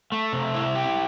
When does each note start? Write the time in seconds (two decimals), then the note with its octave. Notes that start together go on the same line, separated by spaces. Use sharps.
0.12 A3
0.32 C3
0.54 E4
0.75 G4